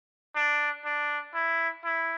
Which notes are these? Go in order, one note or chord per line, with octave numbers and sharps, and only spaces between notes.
D4
D4
E4
E4